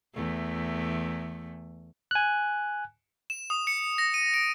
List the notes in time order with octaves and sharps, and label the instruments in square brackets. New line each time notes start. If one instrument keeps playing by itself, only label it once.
[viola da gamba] E2 A3
[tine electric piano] G#5 F#6
[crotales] E7
D#6
C#7
A#6
D#7
D7